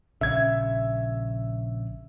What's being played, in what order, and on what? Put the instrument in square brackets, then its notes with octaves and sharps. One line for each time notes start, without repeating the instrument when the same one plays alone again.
[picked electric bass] A#1 C#3 [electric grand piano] E5 G#6